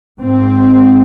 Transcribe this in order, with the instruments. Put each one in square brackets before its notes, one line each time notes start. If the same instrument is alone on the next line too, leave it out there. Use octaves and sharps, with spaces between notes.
[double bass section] G#2 C4